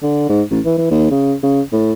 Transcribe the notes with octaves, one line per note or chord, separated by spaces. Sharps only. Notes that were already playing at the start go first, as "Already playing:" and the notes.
D3
G#2
A1
E3
E3
D#2
C#3
C#3
A2